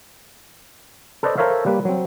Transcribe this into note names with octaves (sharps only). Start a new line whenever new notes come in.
A4 B4 C5 D5 D#5
A4 A#4 C5 C#5 E5 F5
G3 A#3 B4
F#3 C4